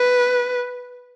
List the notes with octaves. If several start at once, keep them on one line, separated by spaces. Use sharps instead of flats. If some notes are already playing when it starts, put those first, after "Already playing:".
Already playing: B4